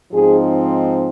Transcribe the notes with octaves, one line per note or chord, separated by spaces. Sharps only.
G#2 F3 C4 D#4 G#4